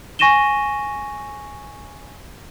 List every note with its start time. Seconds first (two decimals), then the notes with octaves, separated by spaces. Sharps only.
0.19 G#5 C#6 A#6 D#7 E7 G7